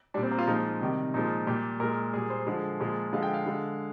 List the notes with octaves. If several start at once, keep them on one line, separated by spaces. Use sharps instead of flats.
A#2 G3 D4
C4
A#3
F4
A#2 F3 G#3 D#4
C3 D#3 G3
A#2 F3 G#3 D#4
A#2 G3 G4
A#2 G#3 A#4
A#2 G3 G#4
C5
D3 F3 G#3
A#2 F3 G#3
D3 F3 G#3 F5
G5
F5
D3 G#3